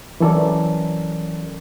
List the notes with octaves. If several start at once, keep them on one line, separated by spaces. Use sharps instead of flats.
E3 F#3 C#4 A4 A#4 D5